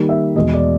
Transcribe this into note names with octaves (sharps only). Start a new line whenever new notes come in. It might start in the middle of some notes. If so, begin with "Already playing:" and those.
Already playing: D#3 G3 A#3 D#4
E5
E2 B2 G#3 D#5
D5